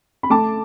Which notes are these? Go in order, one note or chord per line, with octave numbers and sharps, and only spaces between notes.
B5
A3 A5 D6